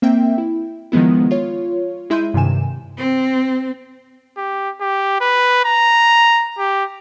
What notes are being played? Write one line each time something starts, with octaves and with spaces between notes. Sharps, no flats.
A#3 C4 E5 G5
E4
D#3 F3 G#3 B3 E4
F4 C#5
G#3 E4 E5 C6 G6 D#7
G2 C3 D#3 G#5 E7
C4
G4
G4
B4
A#5
G4